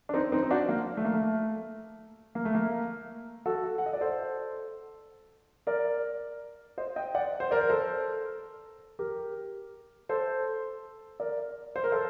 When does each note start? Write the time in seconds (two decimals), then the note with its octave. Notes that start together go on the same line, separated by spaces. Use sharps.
0.09 D4
0.14 C4 D#4
0.32 C4 D#4
0.43 D#4
0.51 D4 F#4
0.69 A#3
0.97 A3
1.05 A#3
1.13 A3
2.35 A#3
2.45 A3
2.55 A#3
3.46 F#4 A4
3.78 F#5
3.86 D#5
3.93 D5
4.01 A4 C5
5.67 A#4 D5
6.78 C5 D#5
6.96 D#5 G5
7.15 D5 F#5
7.40 C5
7.51 A#4 D5
7.61 A#4
7.70 A4 C5
8.99 G4 A#4
10.09 A4 C5
11.20 A#4 D5
11.76 C5
11.84 A#4
11.92 A4 C5